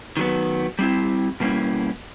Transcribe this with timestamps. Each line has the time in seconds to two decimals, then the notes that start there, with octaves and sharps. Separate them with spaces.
0.17 D#3 F#3 B3
0.79 G3 C4 E4
1.40 B2 G3 A#3 C#4 E4